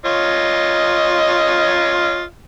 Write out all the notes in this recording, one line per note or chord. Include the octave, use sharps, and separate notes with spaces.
F4 C#5 D#5